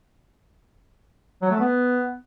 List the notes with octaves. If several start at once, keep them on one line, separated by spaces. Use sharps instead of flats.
F#3
A3
B3